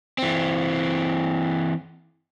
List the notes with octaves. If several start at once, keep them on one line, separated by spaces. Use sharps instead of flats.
E3 C4